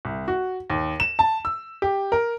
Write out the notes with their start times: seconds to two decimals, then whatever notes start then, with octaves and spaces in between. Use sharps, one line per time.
0.05 C2
0.28 F#4
0.70 D#2
1.00 E7
1.19 A5
1.45 E6
1.82 G4
2.12 A#4